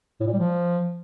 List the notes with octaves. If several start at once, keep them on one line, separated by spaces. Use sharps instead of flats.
A2
A#2
G3
F3